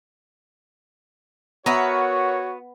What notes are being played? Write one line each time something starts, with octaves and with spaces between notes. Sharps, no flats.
B3 F#4 A#4 B4 C#5 E5